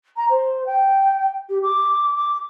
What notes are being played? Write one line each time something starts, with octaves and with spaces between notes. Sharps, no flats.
A#5
C5
G5
G4
D6
D6